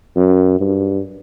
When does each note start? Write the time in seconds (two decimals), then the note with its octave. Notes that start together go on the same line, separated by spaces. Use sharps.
0.16 F#2
0.60 G2